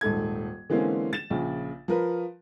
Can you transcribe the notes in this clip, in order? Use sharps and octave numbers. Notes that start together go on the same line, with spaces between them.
D#1 G#2 A4 G#6
D3 E3 G#3 A#3 C4 C#4
A6 E7
A#1 C#3
F3 A#4 B4